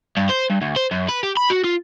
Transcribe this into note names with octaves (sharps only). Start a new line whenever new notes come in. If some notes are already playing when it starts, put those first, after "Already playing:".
G2
C5
G2
D2
C5
F#2
B4
G4
B5
F#4
F4